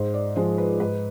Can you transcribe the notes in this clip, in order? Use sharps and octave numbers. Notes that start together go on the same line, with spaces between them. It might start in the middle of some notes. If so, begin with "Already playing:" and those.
Already playing: G#2 C5
D5
F3 G#3 C5
B4
G#2 B4